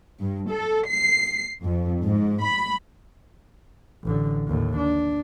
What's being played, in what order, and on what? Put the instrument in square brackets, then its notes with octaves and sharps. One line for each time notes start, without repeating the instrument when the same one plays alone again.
[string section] G2
A4
C7
F2
G#2
B5
[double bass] A1 D3
D#2 A2
D4